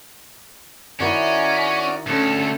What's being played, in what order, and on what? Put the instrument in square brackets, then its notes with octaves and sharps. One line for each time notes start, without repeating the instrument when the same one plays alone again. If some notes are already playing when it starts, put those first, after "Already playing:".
[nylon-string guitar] D#3 D#4 E4 [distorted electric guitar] C#4 [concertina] F#4 D5
[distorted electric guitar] D2 [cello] C#4 A4